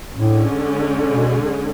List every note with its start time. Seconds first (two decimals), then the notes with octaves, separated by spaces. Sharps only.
0.17 A2 D3 G#3 C#4 G#4
1.10 B2